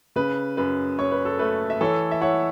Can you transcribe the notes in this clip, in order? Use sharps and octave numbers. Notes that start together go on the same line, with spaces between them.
C#3 B4
F#2 B4
F#2 C#5
B4
A4
A3 B4
E5
E3 A4 C#5
E5
E4 C#5 F#5